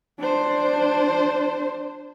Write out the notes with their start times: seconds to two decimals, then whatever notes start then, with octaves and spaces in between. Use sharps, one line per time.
0.19 D4 C5